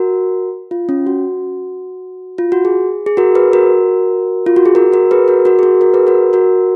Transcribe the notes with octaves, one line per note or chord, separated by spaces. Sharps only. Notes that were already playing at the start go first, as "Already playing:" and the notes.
Already playing: F#4 A#4
F4
C#4
F#4
F4
F#4
G#4
G#4
F#4 A#4
G#4 B4
F#4 A#4
F4
F#4
G#4
F#4 A#4
F#4 A#4
G#4 B4
F#4 A#4
F#4 A#4
G#4
F#4
F#4 A#4
G#4 B4
F#4 A#4
F#4 A#4